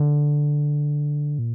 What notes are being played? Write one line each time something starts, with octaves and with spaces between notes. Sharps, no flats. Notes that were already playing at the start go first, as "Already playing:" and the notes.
Already playing: D3
A#2